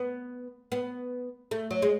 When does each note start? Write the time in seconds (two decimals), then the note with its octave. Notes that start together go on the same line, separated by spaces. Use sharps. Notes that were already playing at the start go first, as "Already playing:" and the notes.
Already playing: B3
0.72 B3
1.51 A3
1.71 F#3
1.82 G#3